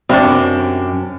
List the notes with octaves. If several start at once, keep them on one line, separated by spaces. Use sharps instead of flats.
F#2 C3 D4